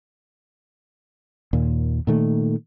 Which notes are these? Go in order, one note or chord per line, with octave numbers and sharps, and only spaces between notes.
D#2 A#2
A#2 D#3 A3